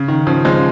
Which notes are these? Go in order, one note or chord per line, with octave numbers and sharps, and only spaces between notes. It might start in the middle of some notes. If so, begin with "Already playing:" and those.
Already playing: C#3
D#3
C#3 F3
F3 G#3